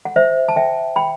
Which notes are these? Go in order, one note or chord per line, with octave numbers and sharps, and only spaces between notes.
F#5
C5 E5
A5
E5 G5
G5 B5